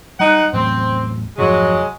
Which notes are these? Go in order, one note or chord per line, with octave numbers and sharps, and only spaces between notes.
G3 D#4 F#5
E2 A2 F#3 C4
F2 G#2 C3 F#3 G#3